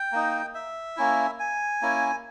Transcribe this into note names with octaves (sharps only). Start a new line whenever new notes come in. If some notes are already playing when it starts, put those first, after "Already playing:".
Already playing: G5
A#3 D#4
E5
A#3 C#4 E4
G#5
A#3 C#4 E4